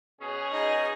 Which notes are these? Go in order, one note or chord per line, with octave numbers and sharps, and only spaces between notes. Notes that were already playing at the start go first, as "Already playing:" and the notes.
B2 C#4 G#4
D#4 D#5